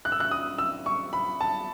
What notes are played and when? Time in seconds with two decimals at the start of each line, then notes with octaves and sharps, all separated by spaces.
0.05 F#6
0.12 E6
0.20 F#6
0.31 D#6
0.58 E6
0.86 C#6
1.13 B5
1.41 A5